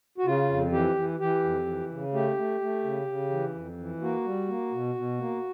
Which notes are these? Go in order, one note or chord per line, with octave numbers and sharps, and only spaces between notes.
F#4
C#3 F4
F2
E3 G4
E3
E3 G4
F2
E3
C#3
A3 G4
A3
A3
C#3
C#3
E3
F2
E3
A#3 F#4
G3
A#3
B2
B2
A#3